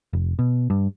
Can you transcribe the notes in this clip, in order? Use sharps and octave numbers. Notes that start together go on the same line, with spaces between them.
F1
B2
G2